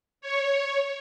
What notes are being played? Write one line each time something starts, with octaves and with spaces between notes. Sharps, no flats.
C#5